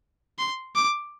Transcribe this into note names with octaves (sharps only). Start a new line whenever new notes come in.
C6
D6